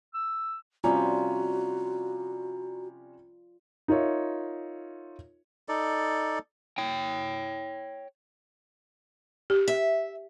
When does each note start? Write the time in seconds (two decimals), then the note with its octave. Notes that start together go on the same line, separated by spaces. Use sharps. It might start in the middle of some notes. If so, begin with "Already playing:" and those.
0.14 E6
0.84 C3 G3 C#4 F4 F#4 D5 A#5
3.88 D#4 F4 A#4 C#5 E5
5.69 D#4 A4 D5
6.78 C#5 G5
9.50 G4
9.68 E5